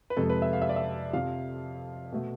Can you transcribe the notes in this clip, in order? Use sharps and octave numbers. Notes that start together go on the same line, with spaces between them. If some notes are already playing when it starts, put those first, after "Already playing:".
B4
F2 C3 G#3 A4
B4
E5
F5
E5
D5
E5
F2 C3 F3 F5
B2 A3